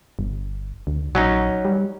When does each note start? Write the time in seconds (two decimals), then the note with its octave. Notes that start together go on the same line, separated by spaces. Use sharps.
0.19 G1
0.87 D2
1.15 A#1 F#3 C#4 D#4
1.65 G3